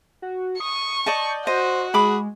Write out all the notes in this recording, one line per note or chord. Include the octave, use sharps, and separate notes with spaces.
F#4
C#6 D#6
D5 D#5 A5 G6
F#4 C5 D#5
G#3 G#4 B5 D6